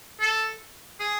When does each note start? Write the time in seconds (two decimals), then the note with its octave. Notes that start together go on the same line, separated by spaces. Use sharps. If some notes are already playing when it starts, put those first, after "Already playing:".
0.20 A4
1.00 G#4